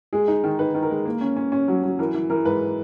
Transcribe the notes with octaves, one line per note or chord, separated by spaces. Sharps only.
G#3 G#4
D#4
D#3
D#4 B4
D#3
A#4
G#3
A#3
C#4
C#4
C#4
F#3
F#3
E3 A#4
E3
E3 A#4
G#2 B4